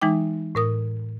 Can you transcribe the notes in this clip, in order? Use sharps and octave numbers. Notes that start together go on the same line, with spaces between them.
E3 G#3 D#4 G5 D6
A2 A#4 D#6